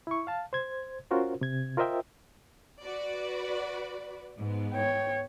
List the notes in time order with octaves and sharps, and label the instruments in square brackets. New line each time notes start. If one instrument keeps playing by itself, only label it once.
[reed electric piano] E4 C#6
F5 A5
C5 G#6
C#4 F4 F#4 A#4 C5
C3 G#6
F4 A#4 C5 D#5 E5 G5
[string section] F#4 B4 D5
G#2 B3
[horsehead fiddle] C#5 G5